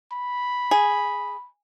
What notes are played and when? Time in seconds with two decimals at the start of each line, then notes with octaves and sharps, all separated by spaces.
0.12 B5
0.71 G#4